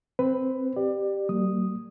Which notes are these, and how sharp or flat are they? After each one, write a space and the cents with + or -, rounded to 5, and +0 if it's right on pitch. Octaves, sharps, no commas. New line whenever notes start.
C4 +0 B4 +15
G4 +0 D5 +25
F#3 +35 A#3 -35 D#6 +0